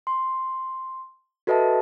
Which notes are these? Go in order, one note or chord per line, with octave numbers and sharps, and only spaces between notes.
C6
F#4 A4 B4 D#5 E5 A5